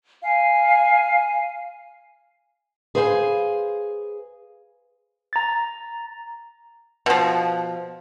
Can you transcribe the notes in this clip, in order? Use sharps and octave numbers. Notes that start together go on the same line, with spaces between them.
F5 G#5
G#4 B4 C5 F5 F#5 G#5
A#5 A6
B2 F3